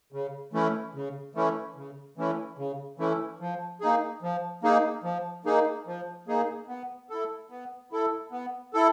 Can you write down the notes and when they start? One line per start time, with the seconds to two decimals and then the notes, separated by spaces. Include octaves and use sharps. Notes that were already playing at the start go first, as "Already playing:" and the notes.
0.12 C#3
0.53 E3 A3 C#4 E4
0.94 C#3
1.35 E3 A3 C#4 E4
1.76 C#3
2.17 E3 A3 C#4 E4
2.58 C#3
2.98 E3 A3 C#4 E4
3.40 F3
3.81 A#3 D#4 G#4
4.22 F3
4.63 A#3 D#4 G#4
5.04 F3
5.45 A#3 D#4 G#4
5.87 F3
6.28 A#3 D#4 G#4
6.68 B3
7.10 E4 A4
7.50 B3
7.92 E4 A4
8.32 B3
8.74 E4 A4